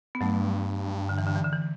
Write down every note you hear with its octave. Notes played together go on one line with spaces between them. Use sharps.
B3
G2 F#3 A3
D3
E3
D3
E3
D3
E3